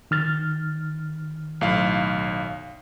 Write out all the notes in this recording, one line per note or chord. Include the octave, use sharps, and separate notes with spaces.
D#3 F6 A6
B1 A2 F5